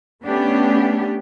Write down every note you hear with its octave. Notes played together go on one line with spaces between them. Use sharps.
A3 B3 C#4 D4 G4